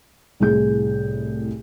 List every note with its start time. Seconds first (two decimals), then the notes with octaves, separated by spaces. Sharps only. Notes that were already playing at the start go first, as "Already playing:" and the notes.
0.40 C2 A2 G#4 G6